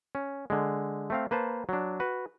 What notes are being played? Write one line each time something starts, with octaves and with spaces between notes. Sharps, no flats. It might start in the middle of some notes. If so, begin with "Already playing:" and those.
C#4
D3 G#3
A3 C4 F5
A#3 B4 C5 A5
F#3 D4
F#4 B4